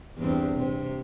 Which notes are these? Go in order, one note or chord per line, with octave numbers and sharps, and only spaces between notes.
E2 G2 C4
C3